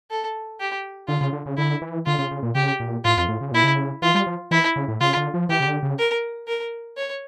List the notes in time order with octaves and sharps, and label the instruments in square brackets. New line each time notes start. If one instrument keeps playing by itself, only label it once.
[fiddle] A4
G4
[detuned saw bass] D3 [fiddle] F4
[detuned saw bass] C#3
D3
C#3
[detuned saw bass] D3 [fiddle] E4
[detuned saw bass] E3
[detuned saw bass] D3 [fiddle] F4
[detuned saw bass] C#3
C#3
A#2
[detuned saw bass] C#3 [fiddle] G4
[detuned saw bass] A#2
[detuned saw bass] A2 [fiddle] F4
[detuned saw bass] F2
A2
C#3
[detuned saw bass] A#2 [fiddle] E4
[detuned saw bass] C#3
[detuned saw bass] E3 [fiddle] F4
[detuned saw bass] G3
F3
[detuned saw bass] E3 [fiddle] E4
[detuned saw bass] C#3
A2
[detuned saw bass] C#3 [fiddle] F4
[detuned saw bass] D3
F3
[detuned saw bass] E3 [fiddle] G4
[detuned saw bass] C#3
D3
C#3
[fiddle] A#4
A#4
C#5